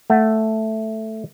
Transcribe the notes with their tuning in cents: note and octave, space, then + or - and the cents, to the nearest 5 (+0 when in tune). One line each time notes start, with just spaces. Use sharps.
A3 +0 F#5 +0